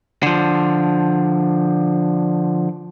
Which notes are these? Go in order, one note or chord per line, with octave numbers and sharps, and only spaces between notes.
D3 F3